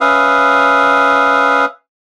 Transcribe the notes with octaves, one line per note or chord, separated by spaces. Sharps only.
C#4 B4 E5 F5 D#6